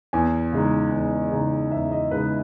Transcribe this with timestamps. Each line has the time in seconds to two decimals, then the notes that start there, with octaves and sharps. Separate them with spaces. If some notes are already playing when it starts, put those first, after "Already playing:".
0.13 E2 G#5
0.52 C#3 G#3 D#4
0.92 E2
1.32 C#3 G#3 D#4
1.71 E2 E5
1.91 D#5
2.11 C#3 G#3 D#4 B4